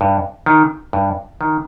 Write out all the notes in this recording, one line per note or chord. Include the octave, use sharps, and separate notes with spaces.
G2
D#3
G2
D#3